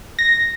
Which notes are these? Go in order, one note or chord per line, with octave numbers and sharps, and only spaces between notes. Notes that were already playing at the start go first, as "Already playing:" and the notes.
A#6